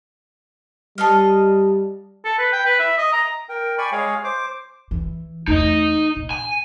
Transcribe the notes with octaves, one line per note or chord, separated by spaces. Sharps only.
G3 A4 D#5 F5
A4
B4
G5
B4
E5
D#5
A#5
A#4 G5
D5 G5 G#5 B5 C#6
G#3 G#4 C#5 F5
C5 D6
E3
E2 A3 D#4 D#5
A#2
G#5